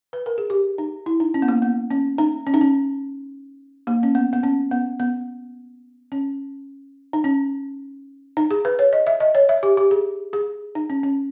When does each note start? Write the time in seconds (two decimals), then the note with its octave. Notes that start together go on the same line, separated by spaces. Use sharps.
0.13 B4
0.26 A#4
0.38 G#4
0.50 G4
0.78 D#4
1.06 E4
1.20 D#4
1.34 C#4
1.42 B3
1.48 A#3
1.62 B3
1.91 C#4
2.18 D#4
2.47 C#4
2.54 D#4
2.61 C#4
3.87 A#3
4.03 C#4
4.15 B3
4.33 B3
4.43 C#4
4.71 B3
5.00 B3
6.12 C#4
7.13 D#4
7.24 C#4
8.37 D#4
8.51 G#4
8.65 B4
8.79 C#5
8.93 D#5
9.07 E5
9.20 D#5
9.35 C#5
9.49 E5
9.63 G4
9.77 G4
9.91 G#4
10.33 G#4
10.75 D#4
10.90 C#4
11.03 C#4